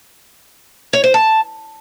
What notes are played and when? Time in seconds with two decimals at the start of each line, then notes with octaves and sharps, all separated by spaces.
0.93 C#5
1.04 C5
1.14 A5